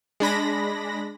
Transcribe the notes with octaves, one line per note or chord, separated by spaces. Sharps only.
G#3 D4 B5 A#6